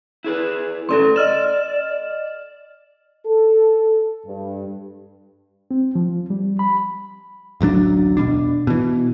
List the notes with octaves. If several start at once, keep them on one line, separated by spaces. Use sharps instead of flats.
E4 G#4 B4
F#2 C#3 A3 A4 D5 C6
D5 D#5 F6 E7
A4
G2
C4
F3
G3
B5
D1 A1 F#3 D4
E1 B1 B2 D4
B2 E3